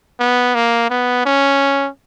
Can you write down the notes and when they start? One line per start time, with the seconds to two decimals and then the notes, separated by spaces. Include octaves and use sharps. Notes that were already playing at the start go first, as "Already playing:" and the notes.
0.20 B3
0.55 A#3
0.90 B3
1.26 C#4